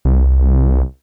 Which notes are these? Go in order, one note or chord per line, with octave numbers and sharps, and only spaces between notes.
C2